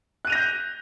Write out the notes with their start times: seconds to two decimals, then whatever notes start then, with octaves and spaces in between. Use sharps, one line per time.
0.25 F#6
0.27 D#7
0.30 F7
0.32 A#6
0.35 G6